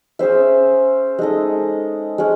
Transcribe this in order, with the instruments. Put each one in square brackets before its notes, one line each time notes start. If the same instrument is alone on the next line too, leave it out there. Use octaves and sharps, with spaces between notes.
[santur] C#4 G#4 C5 E5
G#3 D#4 A4 D#5
G#3 C#4